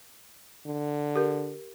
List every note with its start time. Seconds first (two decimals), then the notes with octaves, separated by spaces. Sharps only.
0.66 D3
1.16 G4 A#4